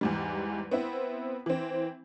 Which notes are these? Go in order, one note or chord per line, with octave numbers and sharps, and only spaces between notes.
E2 G#2 G3
B3 C4 E4
E3 C4